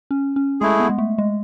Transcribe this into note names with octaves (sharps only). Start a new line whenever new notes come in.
C#4
C#4
G#3 A3 E4 G#4
B3
G#3
A3
G#3